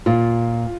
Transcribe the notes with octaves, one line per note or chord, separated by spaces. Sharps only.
A#2 F4